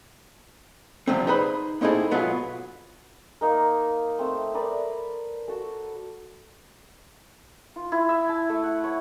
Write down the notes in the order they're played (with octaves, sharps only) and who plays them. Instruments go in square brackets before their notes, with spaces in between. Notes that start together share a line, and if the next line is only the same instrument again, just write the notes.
[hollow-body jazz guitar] E2 G2 C3 F3 G3 C4
D#4 G#4 B4 C5 B5
A#3 C4 D#4 E4 G#4 A4
G#2 B2 F#3 B3 F4 G#4
[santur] A#3 D#4 A#4
A3 C4
A#4 B4 D5
F#4 A4
F4
E4
E5
A5
A3
F#5
C#5